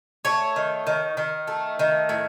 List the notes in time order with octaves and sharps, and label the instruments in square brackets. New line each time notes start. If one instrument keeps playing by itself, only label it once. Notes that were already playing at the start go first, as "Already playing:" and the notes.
[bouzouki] A3 C#5
D#3
D#3
D#3
A3
D#3
A2